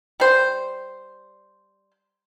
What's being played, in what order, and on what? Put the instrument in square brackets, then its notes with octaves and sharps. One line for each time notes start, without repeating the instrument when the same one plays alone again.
[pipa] G3 C5